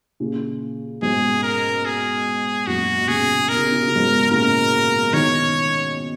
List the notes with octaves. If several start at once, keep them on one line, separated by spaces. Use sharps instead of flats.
A#2 C#3
G#2 B2 G#4
A#4
G#4
F#2 A#2 F#4
B2
A#2 C#3 G#4
B2 A#4
C#3
B2
C#3
B2
C#3
G#2 B2
A#2 C#3 A#4
B2 D#3 C#5